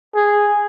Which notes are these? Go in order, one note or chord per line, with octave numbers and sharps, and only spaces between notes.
G#4